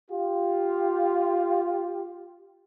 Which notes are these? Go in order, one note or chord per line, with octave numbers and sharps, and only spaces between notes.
F4 G4